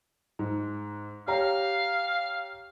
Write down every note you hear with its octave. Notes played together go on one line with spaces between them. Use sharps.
G#2
G4 C#5 F5 A#5